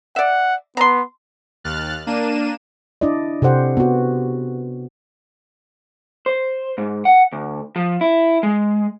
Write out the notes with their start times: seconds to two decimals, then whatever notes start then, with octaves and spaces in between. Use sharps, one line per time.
0.16 D5 E5 F#5
0.77 B3 A#5 C6
1.64 D#2 F6 F#6 A6
2.07 A#3 D4 D#7 E7
3.01 D4 E4 D5 D#5
3.42 C3 G4 A4 C5 F#5
3.77 B3 F#4
6.26 C5
6.78 G#2
7.05 F#5
7.33 D2
7.76 F3
8.01 E4
8.43 G#3